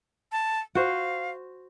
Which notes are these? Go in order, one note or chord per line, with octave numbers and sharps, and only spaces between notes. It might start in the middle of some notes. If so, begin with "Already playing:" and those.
A5
F#4 C5 F5